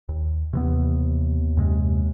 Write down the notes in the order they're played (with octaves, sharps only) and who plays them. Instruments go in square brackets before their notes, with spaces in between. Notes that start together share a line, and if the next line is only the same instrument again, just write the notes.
[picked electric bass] D#2
[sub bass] D#2 [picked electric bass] C3 E3 B3
[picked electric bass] F#2 C3 G#3